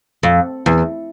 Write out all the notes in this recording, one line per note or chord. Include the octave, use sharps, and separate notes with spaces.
F2
E2